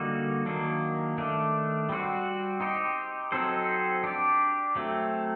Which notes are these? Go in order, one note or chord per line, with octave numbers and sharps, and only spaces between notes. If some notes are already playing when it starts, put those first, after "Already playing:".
Already playing: D3 G3 A#3 D#4 F#4
D#3 F#3 A#3 D4
D#3 A3 D4
G3 C4 F#4
C4 D#4 G4
F#3 C4 D#4 A4 C5
D4 G4 D5
F#3 A3 C4